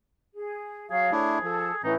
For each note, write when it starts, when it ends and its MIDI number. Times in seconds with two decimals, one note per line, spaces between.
0.34 0.89 68
0.90 1.10 54
0.90 1.10 66
0.90 1.81 68
0.90 1.10 73
0.90 1.10 77
1.12 1.39 57
1.12 1.39 62
1.12 1.39 64
1.12 1.41 73
1.43 1.71 53
1.43 1.74 69
1.84 1.95 45
1.84 1.95 52
1.84 1.95 61
1.84 1.93 63
1.84 1.95 64
1.84 1.95 71